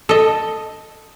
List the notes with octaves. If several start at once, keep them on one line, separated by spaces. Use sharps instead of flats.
A4 D#5